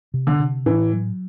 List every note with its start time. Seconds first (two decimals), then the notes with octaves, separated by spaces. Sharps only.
0.14 C3
0.27 D3
0.40 C3
0.66 A2 E3
0.93 F#3